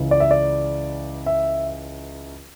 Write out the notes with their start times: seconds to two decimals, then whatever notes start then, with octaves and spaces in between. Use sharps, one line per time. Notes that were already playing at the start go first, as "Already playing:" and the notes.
Already playing: C#2 C#3 E3
0.11 D5
0.20 E5
0.31 D5
1.26 E5